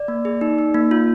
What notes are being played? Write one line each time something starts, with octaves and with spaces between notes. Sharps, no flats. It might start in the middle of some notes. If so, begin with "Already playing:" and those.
Already playing: D5
A#3
G#4
D#4
D#4
A#3
F4